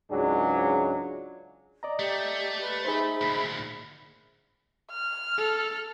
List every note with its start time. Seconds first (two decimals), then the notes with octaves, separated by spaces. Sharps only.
0.10 C#2 G#2 F#3 D4 G#4
1.83 D5 D#5 A#5
1.99 A3 G4
2.61 B4
2.85 D#4 G#4 C5 E5 B5
3.21 D2 A#2
4.91 F6
5.38 A4